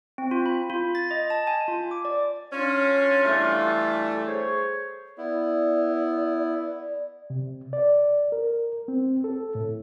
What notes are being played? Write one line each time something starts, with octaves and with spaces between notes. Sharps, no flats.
C4
F4
B5
F4
A6
D#5
A5
G#5
F4
D6
D5
C#4 D4 F4
E3 G3 A3
G#4 C5 C#5
B3 E4 D5
C3
D5
A#4
C4
A4
A2